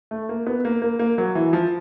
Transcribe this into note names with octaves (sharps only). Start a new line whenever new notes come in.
A3
A#3
B3
A#3
A#3
A#3
F#3
E3
F3